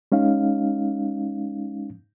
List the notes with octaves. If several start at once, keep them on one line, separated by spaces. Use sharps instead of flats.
G#3 C#4 D#4 F5